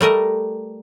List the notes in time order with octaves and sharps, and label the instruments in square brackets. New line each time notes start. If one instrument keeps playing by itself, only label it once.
[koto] G3 A3 A#4 D#5